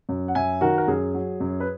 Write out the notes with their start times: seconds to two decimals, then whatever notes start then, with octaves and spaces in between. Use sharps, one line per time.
0.09 F#2
0.28 F#5
0.35 F#2 E5 G#5
0.61 D#3 F#4 A#4
0.78 A#4
0.88 F#2 G#4
1.14 F#3
1.40 F#2
1.60 B4